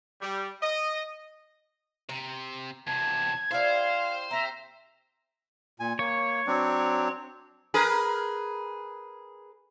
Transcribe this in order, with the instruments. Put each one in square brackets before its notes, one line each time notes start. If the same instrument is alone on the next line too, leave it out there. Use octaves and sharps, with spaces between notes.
[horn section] G3
D#5
[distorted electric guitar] C3 [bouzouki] A#5
[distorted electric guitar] E2 C3 [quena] A5 [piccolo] G#6
[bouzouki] E4 G4 D5 [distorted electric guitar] C5 [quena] F5
[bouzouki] C4 G4 [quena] E5 [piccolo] A#5
[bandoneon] A#2 G#5
[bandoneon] A#3 [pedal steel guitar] C#5
[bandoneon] F#3 C4 D4
[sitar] G#4 A#4 B4